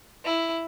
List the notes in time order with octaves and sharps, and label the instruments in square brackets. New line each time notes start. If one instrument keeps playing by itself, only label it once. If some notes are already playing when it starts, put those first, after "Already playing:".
[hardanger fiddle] E4